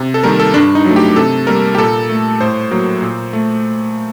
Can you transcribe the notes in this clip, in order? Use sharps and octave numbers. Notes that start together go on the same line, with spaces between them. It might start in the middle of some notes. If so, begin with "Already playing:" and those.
Already playing: C3
A4
D#3 G3 A#3 A#4
A4
G2 D4
D#4
F#3 A3
G4
C3 A4
G3 A#3 A#4
G4
A#2 A4
A3
A2 C5
F#3 A#3
A#2
A3